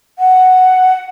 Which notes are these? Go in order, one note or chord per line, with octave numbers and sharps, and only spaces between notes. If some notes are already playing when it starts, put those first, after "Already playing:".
F#5